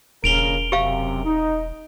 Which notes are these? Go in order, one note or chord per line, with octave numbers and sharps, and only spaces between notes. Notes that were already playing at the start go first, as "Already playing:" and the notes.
E1 A#1 C#3 A#4 D7 F7 G7
F#2 C3 G4 F5
D#4